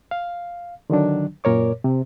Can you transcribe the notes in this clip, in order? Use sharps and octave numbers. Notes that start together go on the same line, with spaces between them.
F5
D3 D#3 F#3 D4
F#2 A#2 A#4 C#5 D6
C3